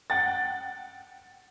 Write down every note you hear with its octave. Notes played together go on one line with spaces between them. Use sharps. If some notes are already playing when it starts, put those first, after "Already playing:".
F#5 G5 A6